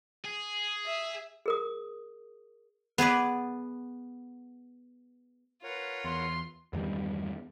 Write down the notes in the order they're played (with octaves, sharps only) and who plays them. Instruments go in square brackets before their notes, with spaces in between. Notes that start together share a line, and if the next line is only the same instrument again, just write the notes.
[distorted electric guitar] G#4
[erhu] E5
[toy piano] G#4 A#4 D#6
[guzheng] B3 G#4 B4 D5
[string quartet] F4 B4 [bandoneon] A#4 C#5 F#5
[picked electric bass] E2 [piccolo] C6
[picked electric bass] E2 G2 D#3 G3